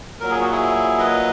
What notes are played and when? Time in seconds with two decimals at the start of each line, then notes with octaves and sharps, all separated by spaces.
0.20 A#2 F#3 A#4
0.31 G#4
0.41 F#4
0.52 E4 G#4
0.99 B4 D#5